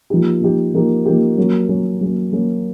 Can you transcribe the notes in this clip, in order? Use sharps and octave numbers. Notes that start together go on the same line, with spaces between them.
F3 A#3 D#4 G4
F3 A#3 D#4 G4
F3 A#3 D#4 G4
F3 A#3 D#4 G4
F#3 A#3 C#4
F#3 A#3 C#4
F#3 A#3 C#4
F#3 A#3 C#4